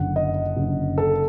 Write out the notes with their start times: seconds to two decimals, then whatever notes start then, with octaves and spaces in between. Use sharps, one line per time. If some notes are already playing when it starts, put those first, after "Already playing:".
Already playing: F#1 F#2 D3 F#5
0.16 D#5
0.57 F#1 F#2 D3
0.98 A4